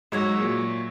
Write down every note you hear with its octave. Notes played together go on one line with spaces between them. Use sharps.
G#2 F#3 G#3 F#4 C#5 E5
A#2 F#3